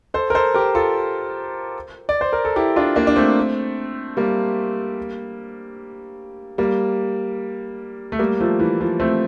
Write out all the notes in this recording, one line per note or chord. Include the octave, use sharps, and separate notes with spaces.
A4 C5
A#4
A4 C5
G4 A#4
F4 A4
D5
C5
A#4
A4
E4 G4
D4 F4
A#3 D4
D4
A3 C4
G3 A#3
G3 A#3
A3
G3 A#3
F3 A3
E3
F3
A3 C4